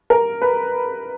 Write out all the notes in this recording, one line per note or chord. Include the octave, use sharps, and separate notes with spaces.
A#4
B4